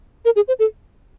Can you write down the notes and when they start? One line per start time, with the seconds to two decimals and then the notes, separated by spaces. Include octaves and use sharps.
0.25 A#4
0.36 G#4
0.48 C5
0.59 A4